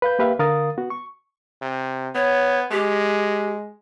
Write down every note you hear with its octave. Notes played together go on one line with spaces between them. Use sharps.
B4 F5 G6
A#3 G4 B4 E5 F5 G5
D3 A#4 F5 D#6 A6
B3 F#4
C#6
C3
B3 C#5
G#3 G4